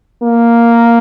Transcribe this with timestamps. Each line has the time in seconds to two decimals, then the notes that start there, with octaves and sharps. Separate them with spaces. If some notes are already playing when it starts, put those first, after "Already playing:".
0.23 A#3